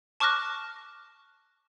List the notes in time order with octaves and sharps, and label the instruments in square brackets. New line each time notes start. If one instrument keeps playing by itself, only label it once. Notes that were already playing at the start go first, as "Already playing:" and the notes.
[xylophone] A5 C#6 D6 F6 F#6 A#6